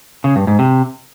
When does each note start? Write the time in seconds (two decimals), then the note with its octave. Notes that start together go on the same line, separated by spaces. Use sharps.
0.24 C#3
0.36 G2
0.47 G#2
0.59 C3